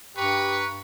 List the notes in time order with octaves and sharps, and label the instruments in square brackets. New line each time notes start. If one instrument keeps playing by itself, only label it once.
[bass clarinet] G2 [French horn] G4 [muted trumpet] B4 [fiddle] A#5 C#6